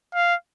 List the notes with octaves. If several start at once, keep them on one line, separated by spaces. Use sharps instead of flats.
F5